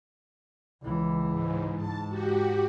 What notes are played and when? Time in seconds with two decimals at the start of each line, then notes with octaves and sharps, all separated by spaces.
0.83 C#2 E3
1.29 G#2
1.76 G#2 A5
2.09 F#4 G4